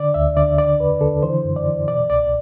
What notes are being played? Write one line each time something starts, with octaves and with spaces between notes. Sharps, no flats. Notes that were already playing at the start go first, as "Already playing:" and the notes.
Already playing: D3 D5
D2 E5
D3 D5
D3 D5
E2 B4
D3 A4
E3 C5
F#2
D5
E3
B2 D5
C2 D5